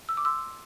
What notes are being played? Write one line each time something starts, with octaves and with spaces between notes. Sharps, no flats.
E6
D6
C6 E6